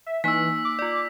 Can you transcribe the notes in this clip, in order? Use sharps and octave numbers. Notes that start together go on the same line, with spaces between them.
E5
E3 A#3 D#4 G#5 E6 B6
D6
F4 D5